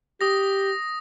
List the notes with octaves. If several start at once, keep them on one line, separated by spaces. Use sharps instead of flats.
G4 D#6 A#6